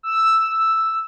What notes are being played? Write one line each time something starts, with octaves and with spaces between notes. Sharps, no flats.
E6